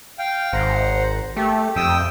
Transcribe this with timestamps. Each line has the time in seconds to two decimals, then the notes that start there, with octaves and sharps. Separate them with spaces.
0.18 F5 G5
0.53 G#1 C5 F#5 A#5
1.37 A3 G4
1.76 F2 G5 D#6 E6